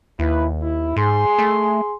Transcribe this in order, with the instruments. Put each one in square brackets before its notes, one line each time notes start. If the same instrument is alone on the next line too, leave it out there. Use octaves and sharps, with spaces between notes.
[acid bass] D#2 [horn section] E4 B4
[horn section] E4
[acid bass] G#2 [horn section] G#4 C6
[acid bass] A3